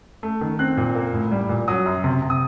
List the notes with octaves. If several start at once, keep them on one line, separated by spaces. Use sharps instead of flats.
A3
D#3
C4 F#6
A#2
A#3
A2
G3
A#2
F#3 D#6
F#2
C3
C3
D#6